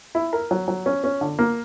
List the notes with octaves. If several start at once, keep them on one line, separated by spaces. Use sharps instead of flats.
E4
A#4
F#3
F#3
C#4
C#4
D3
A#3